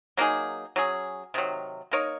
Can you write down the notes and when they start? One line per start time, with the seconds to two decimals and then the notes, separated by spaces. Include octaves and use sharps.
0.17 F#3 A#3 D#4 G#4
0.76 F#3 C#4 G#4
1.34 C3 D#3 F#3
1.91 A#3 D#4 A#4 C#5